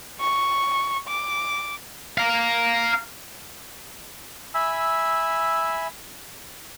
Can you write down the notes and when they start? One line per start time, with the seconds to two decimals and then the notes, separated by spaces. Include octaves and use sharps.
0.21 C#6
1.08 D6
2.18 F5 A#5
4.54 E5 G#5 B5 E6